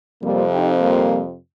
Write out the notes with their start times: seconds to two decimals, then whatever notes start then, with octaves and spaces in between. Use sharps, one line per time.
0.22 F2 C3 F3 G3 A#3
0.52 D#4 G4
0.80 G3 A#3